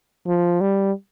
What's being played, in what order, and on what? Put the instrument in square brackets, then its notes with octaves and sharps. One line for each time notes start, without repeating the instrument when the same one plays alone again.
[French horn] F3
G3